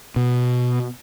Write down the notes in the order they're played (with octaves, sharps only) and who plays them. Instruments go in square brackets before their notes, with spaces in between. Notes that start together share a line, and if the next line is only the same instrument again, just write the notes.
[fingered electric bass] B2